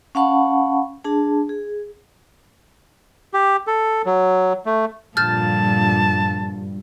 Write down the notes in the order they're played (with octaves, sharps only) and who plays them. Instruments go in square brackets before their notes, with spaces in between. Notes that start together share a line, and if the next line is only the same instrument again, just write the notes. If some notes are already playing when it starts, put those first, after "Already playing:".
[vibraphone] C#4 F5 F#5 A5 B5 C#6
D4 G#4 A5
G#4
[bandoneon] G4
A4
F#3
A3
[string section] G2 [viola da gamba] A#2 D3 F3 [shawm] A5 [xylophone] F6 G6 A6